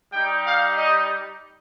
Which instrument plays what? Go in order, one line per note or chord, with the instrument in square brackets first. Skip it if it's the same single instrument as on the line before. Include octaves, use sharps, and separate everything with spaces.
[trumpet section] G3 D#4 G4 G5
F5
D#5